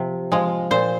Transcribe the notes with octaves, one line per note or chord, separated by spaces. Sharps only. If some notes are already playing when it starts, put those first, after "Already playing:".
Already playing: C3 F3
F3 G#3
A#2 C5